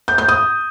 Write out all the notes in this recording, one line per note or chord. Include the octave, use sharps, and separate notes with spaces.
G6
G6
D#6